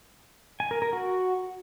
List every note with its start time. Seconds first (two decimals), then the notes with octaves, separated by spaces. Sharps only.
0.60 G#5
0.71 A#4
0.82 A#4
0.93 F#4